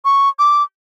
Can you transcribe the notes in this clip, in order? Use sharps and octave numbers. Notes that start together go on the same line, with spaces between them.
C#6
D6